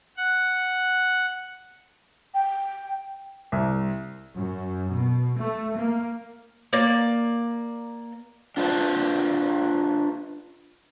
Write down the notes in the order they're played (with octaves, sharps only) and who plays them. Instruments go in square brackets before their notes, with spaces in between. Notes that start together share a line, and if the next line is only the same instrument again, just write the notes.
[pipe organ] F#5
[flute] G5
[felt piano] C2
[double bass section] F#2
B2
A3
A#3
[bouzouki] A#3 D5
[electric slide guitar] D4 F4 B4 C5